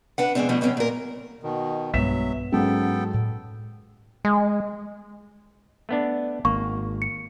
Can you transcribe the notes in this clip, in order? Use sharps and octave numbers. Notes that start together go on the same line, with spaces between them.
D4 B4 F#5
F2 B2 D#3 G#3 C4 D4
B2 D3 F3 G3 A3
G2 B2 D3 A3 C4 C#4
A#2 A#4
B2 D#3
B1 G2 F#3 G#3 B3 E5 B6 E7
G#2 F#3 B3 C#4 A4 G5
A2
G#3
A3 B3 D4
G#1 A#3 C#6
C#7